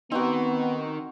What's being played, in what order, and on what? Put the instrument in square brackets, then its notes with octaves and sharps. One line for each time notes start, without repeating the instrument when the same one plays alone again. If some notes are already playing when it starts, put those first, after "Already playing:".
[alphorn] B3 [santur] C4 F#4 [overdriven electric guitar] D#4 A#4